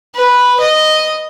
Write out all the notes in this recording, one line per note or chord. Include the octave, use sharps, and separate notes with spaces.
B4
D#5